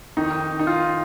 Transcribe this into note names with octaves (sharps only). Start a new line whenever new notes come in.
F2 D#3 D#4
D#4
F4